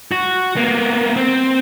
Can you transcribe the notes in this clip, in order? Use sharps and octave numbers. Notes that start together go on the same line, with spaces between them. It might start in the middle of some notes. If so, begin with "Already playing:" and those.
F#4
A#3 B3
C4